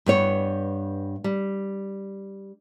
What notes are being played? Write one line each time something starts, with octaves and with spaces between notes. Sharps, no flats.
G2 B3 C#5
G3